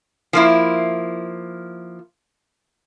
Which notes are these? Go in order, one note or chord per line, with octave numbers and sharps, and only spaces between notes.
F3 A#3 E4